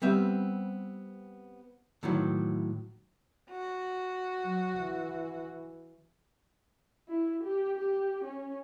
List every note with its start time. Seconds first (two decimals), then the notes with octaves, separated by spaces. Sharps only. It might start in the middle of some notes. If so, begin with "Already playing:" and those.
0.02 G3 B3 C4 E5
2.03 A2 D#3 E3 F#3
3.50 F#4
4.44 F#3
4.77 E3
7.09 E4
7.44 G4
7.79 G4
8.24 C#4